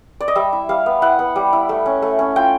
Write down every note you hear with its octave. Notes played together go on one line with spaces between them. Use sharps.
D5
D#5
G3 E5
E4
G3 F5
B3
E4 F#5
B3
G3
E4
A3
C#4
A3
C#4
F4 G5